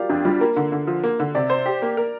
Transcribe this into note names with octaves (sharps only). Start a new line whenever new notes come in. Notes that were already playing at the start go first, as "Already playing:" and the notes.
Already playing: F4 G4 A#4 D5 F5
F2 D4
G3 F4
A#3 A#4
D3
D3
F3
A#3
D3
C3 D5
C5
G4
A#3
A#4